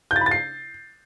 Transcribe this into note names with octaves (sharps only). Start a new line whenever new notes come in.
G6
A6
B5
A6
C7